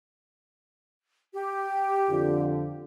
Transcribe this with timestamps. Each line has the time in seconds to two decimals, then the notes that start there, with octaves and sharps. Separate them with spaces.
1.34 G4
2.09 F2 D3 F4